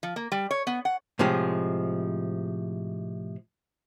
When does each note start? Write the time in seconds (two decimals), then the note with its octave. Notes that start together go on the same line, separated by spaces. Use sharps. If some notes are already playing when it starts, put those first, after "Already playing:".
0.03 F3
0.16 A#3
0.32 G3
0.51 C#5
0.67 B3
0.85 F#5
1.19 A2 C3 F3 G#3